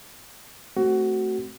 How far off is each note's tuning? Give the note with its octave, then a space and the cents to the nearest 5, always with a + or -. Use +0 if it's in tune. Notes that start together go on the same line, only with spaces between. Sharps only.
A3 +0 C4 +5 F#4 +20